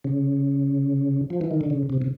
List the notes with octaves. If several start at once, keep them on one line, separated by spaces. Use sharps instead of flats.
C#3
F3
E3
D#3
D3
C#3
C3
C3